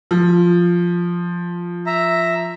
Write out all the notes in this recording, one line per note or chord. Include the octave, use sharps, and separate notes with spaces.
F3
E5 A#5